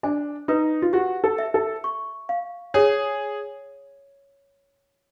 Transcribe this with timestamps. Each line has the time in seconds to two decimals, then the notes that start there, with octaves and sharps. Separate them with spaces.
0.03 D4 G#5
0.48 D#4 B4
0.82 F4
0.93 F#4 G4
1.24 A4
1.38 E5
1.54 A4
1.84 C#6
2.29 F5
2.74 G#4 C#5